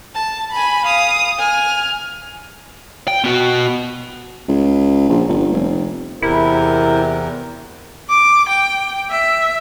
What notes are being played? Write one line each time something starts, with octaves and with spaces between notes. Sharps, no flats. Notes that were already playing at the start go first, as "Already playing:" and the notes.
A5
G#5 B5
F5 D#6
G#5 F6
G5
B3 F#4
C#2
A#1
G1
F1
E2 C3 E4 A#4
D6
G5
E5